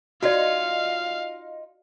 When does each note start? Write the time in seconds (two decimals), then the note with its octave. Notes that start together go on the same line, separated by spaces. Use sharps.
0.23 D#4 F4 F#4 D5 F5